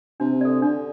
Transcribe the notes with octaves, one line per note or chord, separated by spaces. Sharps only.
C3 D4
A4 D5
D3 D4